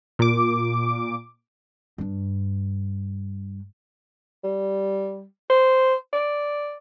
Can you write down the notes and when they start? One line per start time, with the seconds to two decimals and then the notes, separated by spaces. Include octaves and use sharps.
0.19 A#2 D6
1.98 G2 D4
4.44 G3
5.50 C5
6.13 D5